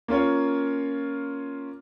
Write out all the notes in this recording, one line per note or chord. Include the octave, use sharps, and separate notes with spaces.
A#3 C#4 F4 C#5